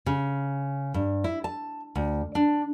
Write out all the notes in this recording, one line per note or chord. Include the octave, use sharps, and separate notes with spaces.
C#3
G2
E4
A5
D2
D4